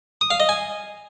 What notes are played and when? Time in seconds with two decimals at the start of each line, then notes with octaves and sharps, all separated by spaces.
0.21 D#6
0.31 F5
0.40 D#5
0.49 G#5